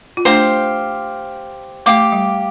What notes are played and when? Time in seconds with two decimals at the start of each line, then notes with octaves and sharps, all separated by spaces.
0.17 F4
0.25 A3 D4 G4 C5 F5 C6
1.86 A3 G4 F5 D6
2.12 G3